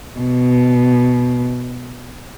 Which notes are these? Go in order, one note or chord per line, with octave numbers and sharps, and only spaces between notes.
B2